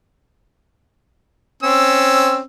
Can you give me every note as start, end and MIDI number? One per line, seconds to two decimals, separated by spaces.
1.63 2.40 60
1.63 2.40 61
1.63 2.40 88